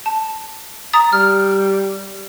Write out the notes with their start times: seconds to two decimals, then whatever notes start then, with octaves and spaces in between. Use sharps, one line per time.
0.06 A5
0.93 A#5 D#6 A6
1.13 G3 F6